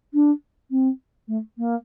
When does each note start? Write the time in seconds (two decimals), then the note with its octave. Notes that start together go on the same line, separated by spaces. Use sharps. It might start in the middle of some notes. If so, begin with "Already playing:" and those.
0.13 D4
0.70 C4
1.28 A3
1.58 A#3